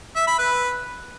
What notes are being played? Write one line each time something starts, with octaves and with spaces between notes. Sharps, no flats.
E5
B5
B4